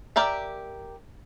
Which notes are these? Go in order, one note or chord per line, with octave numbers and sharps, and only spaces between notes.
G4 A#4 D5 E5